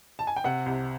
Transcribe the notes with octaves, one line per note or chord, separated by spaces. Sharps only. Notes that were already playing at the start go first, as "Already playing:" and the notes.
A5
G#5
G5
C3 F#5
C2